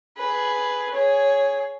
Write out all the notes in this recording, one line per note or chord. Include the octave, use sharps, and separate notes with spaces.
G#4 B4
G#4 C#5